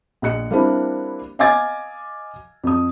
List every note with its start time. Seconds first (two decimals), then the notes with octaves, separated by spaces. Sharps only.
0.22 A#1 D#5 F#6 C#7
0.51 G3 A#3 C4 D4 E4
1.39 D#5 F5 G#5 D6 G#6 A6
2.64 F2 D#6